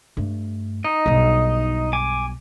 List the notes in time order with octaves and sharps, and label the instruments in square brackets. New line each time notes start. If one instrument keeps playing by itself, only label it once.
[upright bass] G2 A3
[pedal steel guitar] D#4 D#5
[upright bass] B1 G2
[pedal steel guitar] G#5 D6